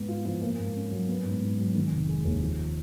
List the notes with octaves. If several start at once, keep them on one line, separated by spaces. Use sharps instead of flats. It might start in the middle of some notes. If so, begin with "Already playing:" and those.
Already playing: G#2 B3
F4
F3
A#3
G#2
C#4
F#3
B3
G#2
G#2
F#3
D#3
F1
G#3
D#2
F3